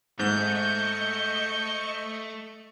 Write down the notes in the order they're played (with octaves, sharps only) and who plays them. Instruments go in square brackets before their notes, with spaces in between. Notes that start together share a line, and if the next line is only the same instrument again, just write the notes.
[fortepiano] G#2 [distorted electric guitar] A3 [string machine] D#5 C#6 C#7 [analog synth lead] G6